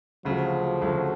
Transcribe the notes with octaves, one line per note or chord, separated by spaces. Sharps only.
D2 C#3 F3 F#3 A3
D2 C#3 F#3 A3